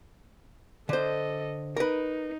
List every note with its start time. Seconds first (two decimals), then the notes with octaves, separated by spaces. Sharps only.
0.89 D3 A4 C5 D#5
1.76 D#4 A#4 B4